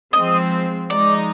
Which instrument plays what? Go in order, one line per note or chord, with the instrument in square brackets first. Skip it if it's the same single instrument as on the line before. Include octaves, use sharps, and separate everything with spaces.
[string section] F3 G#3 C4 [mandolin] D#5
[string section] F3 G#3 D#4 [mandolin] D5